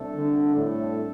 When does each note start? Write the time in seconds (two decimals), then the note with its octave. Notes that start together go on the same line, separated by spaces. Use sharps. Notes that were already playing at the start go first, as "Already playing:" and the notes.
Already playing: C2 C3 A3 D4 A4
0.15 D3
0.56 A2